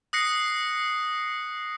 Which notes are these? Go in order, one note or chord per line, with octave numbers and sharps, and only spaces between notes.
D#6 F#6 A#6 C7 C#7